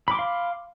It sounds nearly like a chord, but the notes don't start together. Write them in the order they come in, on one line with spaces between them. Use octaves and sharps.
B5 D6 C6 F5